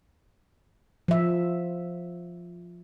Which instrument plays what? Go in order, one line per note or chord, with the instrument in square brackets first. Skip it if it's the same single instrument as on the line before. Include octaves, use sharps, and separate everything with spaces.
[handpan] F3 E5